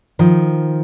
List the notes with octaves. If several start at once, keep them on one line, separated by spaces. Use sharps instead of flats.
D#3 F3